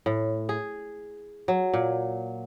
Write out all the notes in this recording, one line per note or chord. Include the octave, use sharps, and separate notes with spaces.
A2
G#4
F#3
A#2